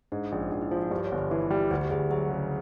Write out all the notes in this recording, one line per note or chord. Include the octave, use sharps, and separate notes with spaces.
G#2 D4
A#1 C#4
A#1 D4
E4
F3 F4
F#4
G2 G4
C#5
G1
B4
E3 F#4
G3 F#4
D2 G4
G4
D2 G#4
F#3 G#4
C#3